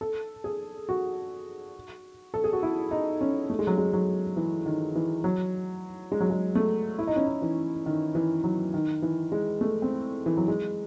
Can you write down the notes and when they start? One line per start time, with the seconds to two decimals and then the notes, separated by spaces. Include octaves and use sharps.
0.01 A4
0.44 G#4
0.89 F#4
2.34 A4
2.44 G#4
2.53 F#4
2.63 E4
2.91 D#4
3.21 C#4
3.50 A3
3.59 G#3
3.67 F#3
3.77 G#3
3.93 F#3
4.36 E3
4.66 D#3
4.95 E3
5.24 F#3
6.12 G#3
6.20 F#3
6.30 G#3
6.55 A3
6.98 E4
7.07 D#4
7.16 C#4
7.26 D#4
7.42 E3
7.86 D#3
8.15 E3
8.44 F#3
8.74 D#3
9.02 E3
9.32 G#3
9.61 A3
9.82 C4
10.26 E3
10.37 F#3
10.48 G#3